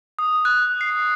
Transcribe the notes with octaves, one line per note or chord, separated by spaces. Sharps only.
D#6
F#6
C7